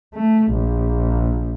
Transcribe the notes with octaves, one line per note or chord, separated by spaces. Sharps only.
A3
A#1